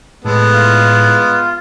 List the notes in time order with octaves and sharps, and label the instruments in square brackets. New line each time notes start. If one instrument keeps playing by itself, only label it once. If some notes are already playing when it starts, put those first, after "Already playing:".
[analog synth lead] A2 [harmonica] G#3 B3 [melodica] A4
[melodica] F4